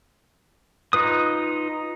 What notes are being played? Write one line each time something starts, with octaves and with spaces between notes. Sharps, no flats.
D#4 F4 B4 D#6